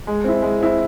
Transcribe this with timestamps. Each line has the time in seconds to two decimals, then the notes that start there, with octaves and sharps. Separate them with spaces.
0.07 G#3
0.24 C4 E4
0.42 G#3
0.61 C4 E4